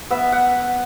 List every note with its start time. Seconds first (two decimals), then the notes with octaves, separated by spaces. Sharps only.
0.10 B3 E5
0.32 F#5